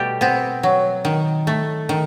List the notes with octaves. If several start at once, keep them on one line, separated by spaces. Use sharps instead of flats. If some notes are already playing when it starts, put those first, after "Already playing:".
Already playing: B2 G3 A3 G4
B3 C4
F#3
D#3
A3
D#3